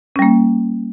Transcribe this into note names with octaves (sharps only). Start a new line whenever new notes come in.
G3 A#3 C#4